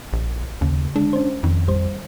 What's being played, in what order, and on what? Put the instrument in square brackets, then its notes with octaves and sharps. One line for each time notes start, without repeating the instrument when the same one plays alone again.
[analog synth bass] A#1
[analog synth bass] D#2 [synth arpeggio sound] C#3
[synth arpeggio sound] D3 G#3 [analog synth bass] D4
[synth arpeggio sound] C#4 C5
[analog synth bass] F2 [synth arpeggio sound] D#3
[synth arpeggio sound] A1 G3 C5